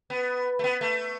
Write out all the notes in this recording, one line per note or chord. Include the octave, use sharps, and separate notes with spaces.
B3
A3
B3
A3